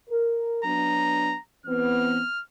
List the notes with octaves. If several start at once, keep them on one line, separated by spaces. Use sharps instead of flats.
A#4
F#3 B3 D4 A#5
E3 B3 C4 F6